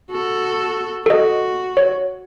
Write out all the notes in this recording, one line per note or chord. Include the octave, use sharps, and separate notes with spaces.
F#4 A4
F#4 A4 D#5
C#5